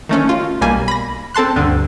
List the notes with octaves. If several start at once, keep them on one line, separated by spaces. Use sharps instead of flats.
D#3 A3 C#4
F4
B1 G3 A#3 G#5
B5 A#6
C4 A4 A5 C6 F#6
D2 G2 D3